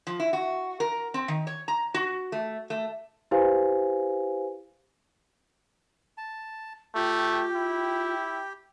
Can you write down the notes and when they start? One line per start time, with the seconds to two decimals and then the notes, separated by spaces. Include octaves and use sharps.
0.07 F3
0.20 E4
0.33 F#4
0.80 A#4
1.14 C4
1.28 D#3
1.47 C#5
1.68 A#5
1.94 F#4
2.32 A3
2.70 A3
3.31 E4 G4 B4 C5 F5 G#5
6.18 A5
6.95 A3 F4 G4 G5
7.55 E4